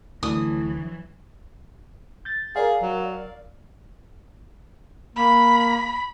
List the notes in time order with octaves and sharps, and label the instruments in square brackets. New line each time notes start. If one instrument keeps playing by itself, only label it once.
[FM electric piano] D2 D4 [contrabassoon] A2 [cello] E3 F#3 [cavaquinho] D#6
[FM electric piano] G6 A6
[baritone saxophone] G#4 [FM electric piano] A#4 D5 F5
[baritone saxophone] F#3
[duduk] A#3 [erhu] B5